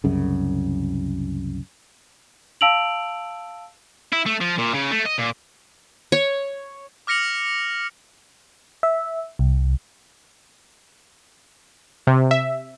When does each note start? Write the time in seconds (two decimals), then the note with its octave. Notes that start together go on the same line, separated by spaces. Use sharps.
0.04 C2 F#2 C#3
2.61 F5 A5 E6 D7 F7 F#7
4.12 E4
4.26 A3
4.41 F3
4.58 A#2
4.74 C#3
4.91 A3
5.05 D#5
5.18 A#2
6.12 C#5
7.07 D6 F6 A#6 C#7 F7 F#7
8.83 E5
9.39 C2
12.07 C3
12.31 E5